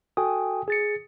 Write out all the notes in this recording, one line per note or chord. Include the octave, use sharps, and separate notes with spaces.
F#4 A4 G5 G#5 D#6
G#4 A6 C#7